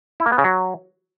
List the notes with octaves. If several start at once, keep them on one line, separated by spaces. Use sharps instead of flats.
E4
A#3
B3
C#3
F#3